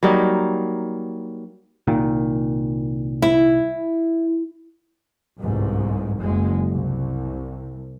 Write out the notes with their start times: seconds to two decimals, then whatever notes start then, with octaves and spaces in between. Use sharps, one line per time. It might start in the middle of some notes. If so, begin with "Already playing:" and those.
0.03 F#3 G3 A#3 D#4
1.87 C2 A#2 D#3
3.22 E4
5.39 G1 C2 G#2
6.18 F#1 G#3
6.71 C2